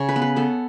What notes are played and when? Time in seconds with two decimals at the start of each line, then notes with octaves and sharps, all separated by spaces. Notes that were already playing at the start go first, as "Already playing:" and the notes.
Already playing: C#3 C#5
0.09 B4
0.16 B3
0.22 B4
0.36 B3 A4